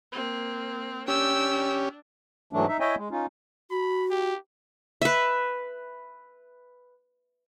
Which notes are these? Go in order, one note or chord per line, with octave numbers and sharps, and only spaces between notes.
A#3 C4
C#4 D4 G4 G5 E6
G#2 E3 F#3 A3 D4
D#4 E5
E4 C#5 D#5 E5 G5 G#5
G#3
C#4 D#4 F4
F#4 B5
G4
B4 E5